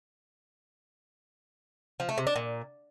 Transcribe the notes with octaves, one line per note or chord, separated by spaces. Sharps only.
F3
A3
C3
D4
A#2